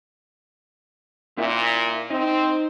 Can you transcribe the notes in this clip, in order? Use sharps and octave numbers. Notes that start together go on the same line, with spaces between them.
A#2 E4 A#4 E5
C4 D#4